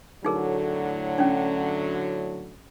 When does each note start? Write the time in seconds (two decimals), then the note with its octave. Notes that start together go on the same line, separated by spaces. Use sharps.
0.25 A2 D3 F#3 D#4 G#4 A#4
1.18 C#4 D4